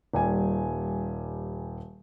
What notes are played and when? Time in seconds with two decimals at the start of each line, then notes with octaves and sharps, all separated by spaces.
0.14 D#1 G3 G#5